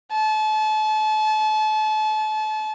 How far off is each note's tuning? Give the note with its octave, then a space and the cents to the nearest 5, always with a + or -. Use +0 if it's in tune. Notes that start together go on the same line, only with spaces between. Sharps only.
A5 -35